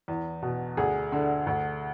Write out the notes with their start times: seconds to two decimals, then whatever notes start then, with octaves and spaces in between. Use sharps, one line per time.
0.08 E2
0.42 B2
0.77 D2 G#4
1.12 D3
1.47 D2